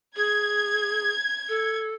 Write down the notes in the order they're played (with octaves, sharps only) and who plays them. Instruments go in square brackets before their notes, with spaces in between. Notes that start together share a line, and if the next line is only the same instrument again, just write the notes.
[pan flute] G#4 [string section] G#6
[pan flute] A4